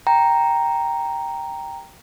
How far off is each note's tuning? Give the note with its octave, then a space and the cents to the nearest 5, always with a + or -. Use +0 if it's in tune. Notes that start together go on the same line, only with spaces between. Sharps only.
G5 +0 A#5 +0